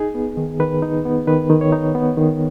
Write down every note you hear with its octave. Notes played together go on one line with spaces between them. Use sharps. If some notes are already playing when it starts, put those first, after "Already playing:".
Already playing: D#4 G#4
B3
D#3
D#3 B4
D#4
B3
D#3 B4
D#3
C#5
D#4
B3
D#3